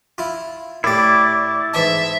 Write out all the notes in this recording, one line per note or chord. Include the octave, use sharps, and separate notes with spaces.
E4 F4
A2 E4 G4 D5
G#2 E3 E5 A5